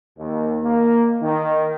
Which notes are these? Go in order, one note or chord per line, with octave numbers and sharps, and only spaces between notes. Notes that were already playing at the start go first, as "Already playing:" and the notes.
D#2
A#3
D#3